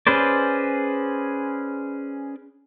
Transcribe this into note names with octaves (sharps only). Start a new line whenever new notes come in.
C#4 G#4 B4 C5 D5